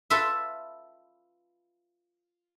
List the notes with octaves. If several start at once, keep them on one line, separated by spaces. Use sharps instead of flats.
F4 A4 B4 E5